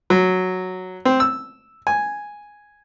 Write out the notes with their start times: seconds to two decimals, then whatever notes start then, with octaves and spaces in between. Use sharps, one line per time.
0.10 F#3
1.05 C4
1.20 E6
1.87 G#5